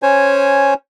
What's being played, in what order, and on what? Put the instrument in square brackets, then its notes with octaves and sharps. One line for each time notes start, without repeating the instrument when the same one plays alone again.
[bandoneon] C#4 C5 C#5 G#5